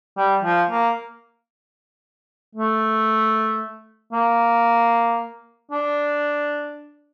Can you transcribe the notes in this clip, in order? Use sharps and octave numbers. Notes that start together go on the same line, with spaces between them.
G3
F3
A#3
A3
A#3
D4